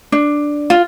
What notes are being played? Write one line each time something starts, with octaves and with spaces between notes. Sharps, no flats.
D4
F4